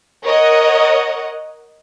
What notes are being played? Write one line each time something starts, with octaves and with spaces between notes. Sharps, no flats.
A#4 C#5 D#5 F#5